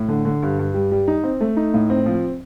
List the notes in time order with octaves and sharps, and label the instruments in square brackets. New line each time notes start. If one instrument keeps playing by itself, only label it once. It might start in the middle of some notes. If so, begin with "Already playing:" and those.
Already playing: [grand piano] A2
D3
D3
G2
G2
G3
G3
D#4
C4
A3
D#4
A2
C4
F3